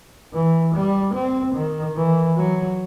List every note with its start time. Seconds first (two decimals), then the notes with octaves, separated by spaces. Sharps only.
0.33 E3
0.74 G3
1.14 C4
1.55 D#3
1.96 E3
2.37 F#3